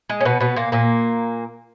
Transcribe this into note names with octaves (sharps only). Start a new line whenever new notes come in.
G#3
C#4
B2 B3
B2 B3
A#2 A#3
A#2 A#3